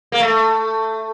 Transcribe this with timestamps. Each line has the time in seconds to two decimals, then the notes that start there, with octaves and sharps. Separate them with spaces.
0.12 A#3
0.20 A3